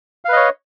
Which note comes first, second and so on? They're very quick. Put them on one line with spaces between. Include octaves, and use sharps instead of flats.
F5 B4 D#5 C#5